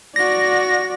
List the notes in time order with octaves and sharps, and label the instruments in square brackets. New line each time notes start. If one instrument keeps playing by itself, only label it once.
[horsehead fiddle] F#4 D5 [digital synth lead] A#6